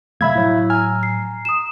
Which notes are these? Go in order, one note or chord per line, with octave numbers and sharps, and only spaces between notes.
C3 F#3 A3 E5 F5 B5 E6 G#6
A2 F#3 E4 C#5 E6
G#5 A#5 F6
C7
D#6 E7